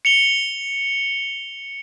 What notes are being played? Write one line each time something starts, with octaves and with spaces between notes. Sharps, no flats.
C#7 F7 G7